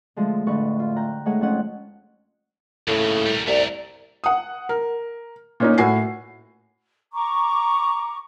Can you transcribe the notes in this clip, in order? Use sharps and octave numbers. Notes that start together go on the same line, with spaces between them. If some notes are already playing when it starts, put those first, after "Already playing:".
D3 F3 G#3 A3
F2 A2 D3 F3 B4 C#6
F4
G5 A#5 F#6 G6
G#3 A3 D#4 G#4 C#5 F#5
F2 F3 C#4 F#5
D#2 A2 C#3
G3 A#4
C2 A3 A#4 D5
F#5 D#6
A#4
A#2 C#4 D#4
A2 F#4 G#5 C7
A#5 C#6 D6